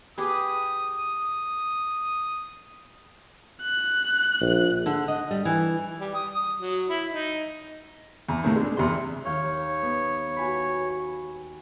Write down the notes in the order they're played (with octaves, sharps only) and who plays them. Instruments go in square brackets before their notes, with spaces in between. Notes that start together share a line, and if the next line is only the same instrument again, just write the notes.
[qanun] G4 G#4 B4 [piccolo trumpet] D#6
[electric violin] F#6
[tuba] A#1
[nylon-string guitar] D3
D#5
G3
E3
[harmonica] G3
D#6
D#6
F#3
E4
D#4
[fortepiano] E2
D#2 A2
G#3 D4
E2 C3 C6
[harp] D#2 F5 G6 [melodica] C#5
[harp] B3
F#4 G#5 B5